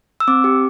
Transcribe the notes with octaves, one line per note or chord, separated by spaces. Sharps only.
E6
C4 D6
G4